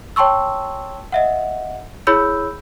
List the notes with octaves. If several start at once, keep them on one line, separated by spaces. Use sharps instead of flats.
C#5 G5 A5 C6 C#6 E6
D#5 E5 F#5
E4 G#4 C#5 B5 E6 G6